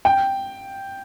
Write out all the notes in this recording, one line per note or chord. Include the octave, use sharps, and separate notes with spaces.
G5